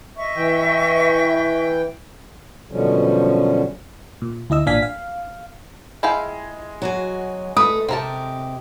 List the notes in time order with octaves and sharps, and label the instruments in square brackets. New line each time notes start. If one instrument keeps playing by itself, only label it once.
[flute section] D#5 E5 C#6
[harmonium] E3 G5
F#2 B2 D3 F3 G3 C#4
[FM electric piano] A#2
D2 E4 D#5 E6
A1 A#2 D4 F5 G#5 B6
F5
[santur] G#3 [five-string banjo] E4 F5 G5
[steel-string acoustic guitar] F#3 F#4 G#5
[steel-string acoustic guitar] A3 [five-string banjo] B4 [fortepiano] D#6
[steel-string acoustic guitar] C3 G4 [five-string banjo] C4 A#4 A5